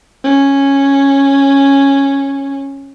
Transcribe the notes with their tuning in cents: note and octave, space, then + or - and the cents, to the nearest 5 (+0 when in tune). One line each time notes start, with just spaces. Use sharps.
C#4 -5